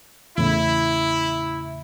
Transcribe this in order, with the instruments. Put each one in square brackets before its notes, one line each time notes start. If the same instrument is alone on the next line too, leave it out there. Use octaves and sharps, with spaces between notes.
[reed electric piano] E2 A2 C#3 [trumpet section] E4